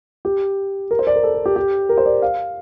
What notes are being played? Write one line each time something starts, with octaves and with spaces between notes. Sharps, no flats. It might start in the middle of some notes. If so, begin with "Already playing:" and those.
G4
A#4
C5
D5
A#4
A4
A4
G4
G4
A#4
C5
D5
F5